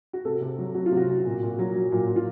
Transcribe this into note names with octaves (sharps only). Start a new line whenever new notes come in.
F#4
C3 A4
C3
F#3
F#3 F#4
F4
C3 F#4
C3
A#2
A#2
F#3
F#3
A#2
A#2
F4